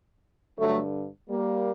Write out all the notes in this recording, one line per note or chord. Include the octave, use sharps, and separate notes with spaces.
G2 D3 F#3 A3
G3 A#3